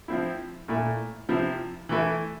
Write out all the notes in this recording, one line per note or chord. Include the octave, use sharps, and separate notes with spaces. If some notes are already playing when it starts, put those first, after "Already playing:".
F3 C4 E4
A#2 A3 E4
C3 F3 C4 E4
E3 A3 E4